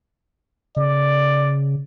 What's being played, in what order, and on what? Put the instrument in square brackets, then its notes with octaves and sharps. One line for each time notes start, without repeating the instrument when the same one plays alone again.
[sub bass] C#3 [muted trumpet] D5